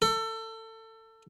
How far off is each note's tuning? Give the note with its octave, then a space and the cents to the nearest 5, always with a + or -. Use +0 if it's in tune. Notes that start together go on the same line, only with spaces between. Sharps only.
A4 +25